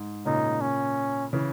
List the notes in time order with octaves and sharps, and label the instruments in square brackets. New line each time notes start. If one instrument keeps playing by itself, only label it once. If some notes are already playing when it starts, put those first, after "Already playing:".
Already playing: [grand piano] G#2
[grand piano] A#2 C#3 [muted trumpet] D#4
[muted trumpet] C#4
[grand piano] C#3 E3